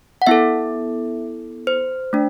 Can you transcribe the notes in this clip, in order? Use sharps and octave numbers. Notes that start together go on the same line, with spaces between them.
F#5
B3 E4 A4 E5
C5
A3 D4